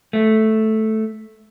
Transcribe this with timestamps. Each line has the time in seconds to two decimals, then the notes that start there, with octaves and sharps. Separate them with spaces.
0.13 A3